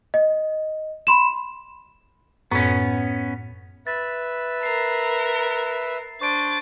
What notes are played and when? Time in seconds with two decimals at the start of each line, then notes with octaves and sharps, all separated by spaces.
0.14 D#5
1.07 B5 C6 E7
2.51 F#2 A2 B3 C#4
3.87 B4 E5 A6
4.63 A#4 C7
6.21 D4 C5 C#6 A6 D7